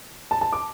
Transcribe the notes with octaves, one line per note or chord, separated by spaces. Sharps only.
A5
A5
D6